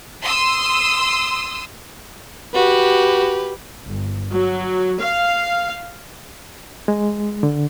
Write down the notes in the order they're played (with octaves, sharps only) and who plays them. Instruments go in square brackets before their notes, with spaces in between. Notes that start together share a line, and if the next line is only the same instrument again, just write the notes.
[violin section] C6 D#6 E6
[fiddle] F#4 [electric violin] G4 B4
[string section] G1
F#3
F5
[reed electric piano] G#3
D3